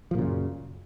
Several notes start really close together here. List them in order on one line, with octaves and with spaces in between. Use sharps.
F3 A#2 C#3 F#2